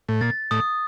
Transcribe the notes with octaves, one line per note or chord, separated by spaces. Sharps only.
A2
A#2 A6
A2 D#6